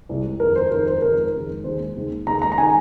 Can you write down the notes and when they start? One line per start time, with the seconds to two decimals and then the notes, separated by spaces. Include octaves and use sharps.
0.09 C2 C3 G#3
0.40 F2 D#3 G#3 A#4
0.56 C5
0.71 F2 D#3 G#3 A#4
0.87 C5
1.02 F2 D#3 G#3 A#4
1.33 F2 D#3 G#3
1.64 D#2 D#3 G#3 C5
1.96 D#2 D#3 G#3
2.27 D#2 D#3 G#3 A#5
2.42 A#5
2.52 A#5
2.58 D#3 G#3 G#5